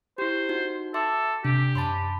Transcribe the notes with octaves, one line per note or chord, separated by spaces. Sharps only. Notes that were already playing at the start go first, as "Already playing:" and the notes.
E4 G4 C5
D#4 F#4
A4 E5 C6 D6
C3 D4 G4
F#2 A5 B5 C6 A6 D7